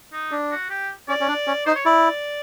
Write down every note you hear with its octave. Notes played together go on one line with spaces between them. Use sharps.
D#4
D4
F#4
G4
C#4 D5
C#4
D4
C#4
D#4 C5
C#5
E4 D5